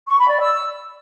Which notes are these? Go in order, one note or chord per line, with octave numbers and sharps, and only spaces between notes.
C#6
B5
D5
E6